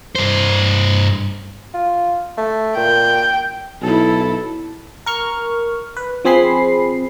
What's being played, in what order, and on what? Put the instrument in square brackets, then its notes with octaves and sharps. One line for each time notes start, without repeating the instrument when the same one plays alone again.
[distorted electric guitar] G2 C5
[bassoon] F4
A3
[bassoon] A#2 [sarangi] G5
[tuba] B1 [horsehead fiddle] E4 A4
[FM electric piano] A#4 C#6 F6
B4
F3 C4 G#4 B5 C7